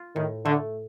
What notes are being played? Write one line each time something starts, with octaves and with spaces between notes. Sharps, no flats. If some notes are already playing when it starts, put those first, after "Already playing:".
Already playing: F4
A2 D#3
D3 A3